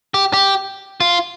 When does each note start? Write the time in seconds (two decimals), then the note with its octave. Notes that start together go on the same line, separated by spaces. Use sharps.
0.14 G4
0.34 G4
1.00 F4